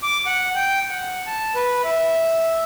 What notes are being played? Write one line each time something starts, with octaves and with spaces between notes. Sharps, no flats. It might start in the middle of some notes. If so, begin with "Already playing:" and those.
D6
F#5
G5
F#5
A5
B4
E5